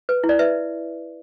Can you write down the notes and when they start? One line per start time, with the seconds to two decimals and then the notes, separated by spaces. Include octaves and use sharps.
0.09 B4
0.24 E4
0.29 D5
0.39 B4 E5